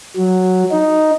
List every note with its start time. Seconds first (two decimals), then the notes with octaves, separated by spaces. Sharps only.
0.17 F#3
0.71 D#4